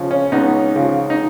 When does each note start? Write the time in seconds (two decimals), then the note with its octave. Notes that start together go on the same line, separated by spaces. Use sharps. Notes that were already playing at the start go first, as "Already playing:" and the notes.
Already playing: C#3 F3 C#4
0.11 C#4
0.32 C#2 B3 D#4
0.76 C#3 F3
1.10 D#4